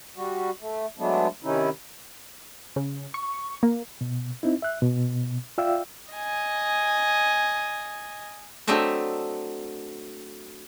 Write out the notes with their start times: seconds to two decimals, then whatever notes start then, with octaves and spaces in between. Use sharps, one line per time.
0.16 G3 F#4
0.61 A3
0.98 F#3 G#3 A3 B3 D4
1.43 C3 D#3 C#4 D#4 E4
2.76 C#3
3.14 C#6
3.63 A#3
4.01 B2
4.43 C4 D#4 E4
4.62 E5 F#6
4.82 B2
5.58 F4 D5 E5 F5 G5 E6
6.12 D#5 G#5
8.67 F#3 A3 C4 D4 D#5 E5